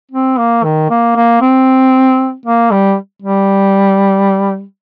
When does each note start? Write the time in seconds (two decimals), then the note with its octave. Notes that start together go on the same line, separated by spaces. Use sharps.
0.12 C4
0.38 A#3
0.64 D#3
0.90 A#3
1.16 A#3
1.41 C4
2.46 A#3
2.71 G3
3.22 G3